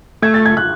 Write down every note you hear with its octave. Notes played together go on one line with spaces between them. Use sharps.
A3 G#6
A6
G#6
F#6